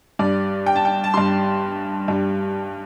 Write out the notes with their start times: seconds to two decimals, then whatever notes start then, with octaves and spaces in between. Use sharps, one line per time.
0.19 G2 G3 D5
0.66 G5
0.76 A5
0.85 G5
1.04 A5
1.14 G2 G3 C6
2.08 G2 G3